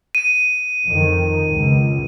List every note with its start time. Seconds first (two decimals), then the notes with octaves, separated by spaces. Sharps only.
0.15 D#7
0.87 F2 D#3
1.55 C#2